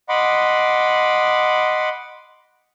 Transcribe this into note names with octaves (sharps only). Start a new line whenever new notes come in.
D#5 F#5 B5 C6 D6